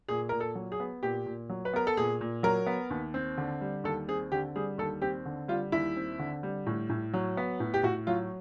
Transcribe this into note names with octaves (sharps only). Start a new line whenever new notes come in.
A#2 G#4
A#2 A#4
A4
F#3
G#4
B3
A#2 G4
A#2
F#3
B4
B3 A#4
A4
A#2 G#4
A#2
F#3 A#4
B3
D#2
C4
D3
G3
D#2 A4
C4 G#4
D3 G4
G3 G#4
D#2 A4
C4 G4
D3
G3 F4
D#2 E4
C4
D3
G3
A2
A2
F#3
B3
A2
G4
A2 F#4
F#3 F4